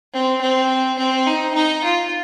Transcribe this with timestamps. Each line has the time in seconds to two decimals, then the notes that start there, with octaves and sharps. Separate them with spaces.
0.13 C4
0.41 C4
0.98 C4
1.27 D#4
1.54 D#4
1.84 F4